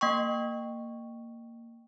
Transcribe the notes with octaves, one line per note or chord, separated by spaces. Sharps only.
A#3 G5 C#6